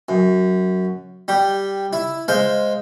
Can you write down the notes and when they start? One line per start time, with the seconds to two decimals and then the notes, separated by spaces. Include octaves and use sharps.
0.09 F#2
1.28 G3 G4
1.93 E4
2.28 G#3 C5 F5